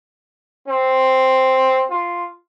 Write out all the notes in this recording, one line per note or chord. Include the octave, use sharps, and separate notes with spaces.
C4
F4